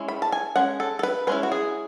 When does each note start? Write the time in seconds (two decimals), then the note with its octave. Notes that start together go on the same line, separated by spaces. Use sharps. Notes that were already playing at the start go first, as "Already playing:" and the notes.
Already playing: G#3 C#4 E4
0.08 B5
0.22 A5
0.32 G#5
0.56 G#3 C#4 F#5
0.80 A4
0.99 A4
1.03 B4
1.27 G#3 C#4 E4 B4
1.43 F#4
1.52 G#4